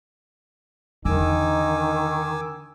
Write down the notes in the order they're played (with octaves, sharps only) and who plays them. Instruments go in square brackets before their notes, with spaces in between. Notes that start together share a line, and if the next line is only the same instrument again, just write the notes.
[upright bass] E2 D3 [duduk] D#3 [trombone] D#4 [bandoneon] G#5 D6 E6